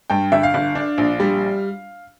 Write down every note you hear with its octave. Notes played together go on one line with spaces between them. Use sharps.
G2 G5
G1 E5
F5
G1
D4
A#1
G3